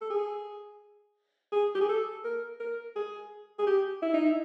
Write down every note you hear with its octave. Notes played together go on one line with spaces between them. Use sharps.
A4
G#4
G#4
G4
G#4
A4
A#4
A#4
G#4
G#4
G4
E4
D#4
E4